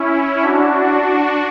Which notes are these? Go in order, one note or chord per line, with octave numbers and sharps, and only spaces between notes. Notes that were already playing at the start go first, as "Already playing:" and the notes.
Already playing: C#4 E4
D4 F#4